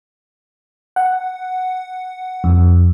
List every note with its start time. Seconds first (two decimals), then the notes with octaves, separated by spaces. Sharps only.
0.96 F#5
2.44 F2